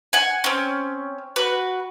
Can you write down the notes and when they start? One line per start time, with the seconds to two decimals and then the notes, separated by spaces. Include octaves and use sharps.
0.13 F#5 G#5
0.44 C4 C#4
1.36 F#4 B4